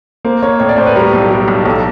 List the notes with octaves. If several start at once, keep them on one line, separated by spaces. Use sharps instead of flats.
A#3 C5
A#3 C#5
A2 C#5
D5
A2 C5
B4
G3 A#4
B1
G3
B1
B1 A4